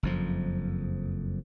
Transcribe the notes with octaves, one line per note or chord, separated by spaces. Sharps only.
F#1 F2 F3